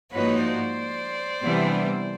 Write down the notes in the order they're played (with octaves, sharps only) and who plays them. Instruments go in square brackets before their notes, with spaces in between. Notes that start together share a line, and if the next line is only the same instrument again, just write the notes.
[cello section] G#2 F3 A#3 D#4 F#4 [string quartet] B4 C#5
[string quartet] C5 D5
[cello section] C3 E3 G3 B3 D4